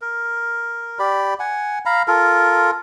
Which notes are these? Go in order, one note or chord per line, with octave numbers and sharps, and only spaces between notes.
A#4
G4 D5 B5
F#5 G#5
F5 A#5 B5
F4 A4 A#4